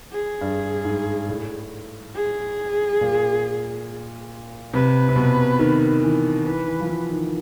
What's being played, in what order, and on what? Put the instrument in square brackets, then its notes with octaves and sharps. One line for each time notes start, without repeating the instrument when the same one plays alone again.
[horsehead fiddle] G#4
[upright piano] G2
G#2
A2
[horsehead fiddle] G#4
[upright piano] A#2
[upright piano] C3 [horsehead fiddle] B4
[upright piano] C3
B2
D#3
E3
[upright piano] E3 [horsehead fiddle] B4
[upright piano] E3
F3
E3
D#3